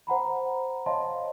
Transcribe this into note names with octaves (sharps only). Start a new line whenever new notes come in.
C5 F#5 A#5 B5
C5 C#5 D#5 F5 A5 C6